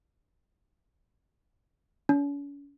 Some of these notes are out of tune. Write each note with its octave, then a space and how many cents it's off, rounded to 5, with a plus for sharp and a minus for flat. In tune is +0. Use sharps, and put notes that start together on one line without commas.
C#4 +40